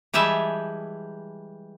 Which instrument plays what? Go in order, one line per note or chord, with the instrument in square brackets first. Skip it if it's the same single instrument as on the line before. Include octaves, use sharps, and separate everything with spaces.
[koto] E3 G3 G#3 E5 A5